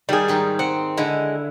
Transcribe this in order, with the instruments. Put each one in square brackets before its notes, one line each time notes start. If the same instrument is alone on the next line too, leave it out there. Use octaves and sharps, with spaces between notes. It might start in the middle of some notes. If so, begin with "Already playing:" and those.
[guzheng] D#3 [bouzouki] G3 G#4
[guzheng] G#2 D#3 D#4
[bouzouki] C4 [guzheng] F#5
[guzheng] D3 E4 [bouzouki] G#3